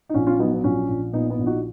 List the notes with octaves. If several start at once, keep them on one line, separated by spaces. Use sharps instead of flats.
D#4
A#1 C#4
C#4 F4
F#3 B3 D#4
B3
A#1 C#4
A#1
A#2 B3 D#4
B3 D#4
A#1
D#4 F#4